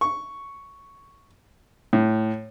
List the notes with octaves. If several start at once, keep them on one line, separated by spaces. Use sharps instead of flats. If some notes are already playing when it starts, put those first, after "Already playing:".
C#6
A2